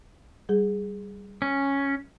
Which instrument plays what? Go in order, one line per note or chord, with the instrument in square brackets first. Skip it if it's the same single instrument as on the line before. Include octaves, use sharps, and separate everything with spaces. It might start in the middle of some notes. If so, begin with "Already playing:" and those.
[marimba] G3 G#4
[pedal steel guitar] C#4